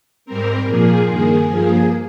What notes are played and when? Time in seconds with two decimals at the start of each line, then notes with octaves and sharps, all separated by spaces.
0.26 G#2 G3 C4 A#4
0.66 A#2 F3 A#3 G#4
1.07 G2 D#3 A#3 G#4
1.47 G2 F3 A#3 G#4